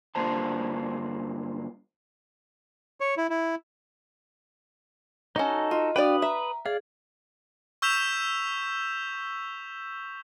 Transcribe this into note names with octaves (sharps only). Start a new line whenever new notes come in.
G2 D3 A#3 F4 C5 A5
C#5
E4
E4
C#4 D#4 F#4 A4 D#5
F4 D#5
D4 F#4 B4 D5 F5 G5 D#6
E5 A#5
G#4 D5 F5
C#6 E6 G6 B6 E7 F7